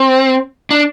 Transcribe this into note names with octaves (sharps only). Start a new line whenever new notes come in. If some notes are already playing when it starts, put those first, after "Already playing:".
Already playing: C4
D4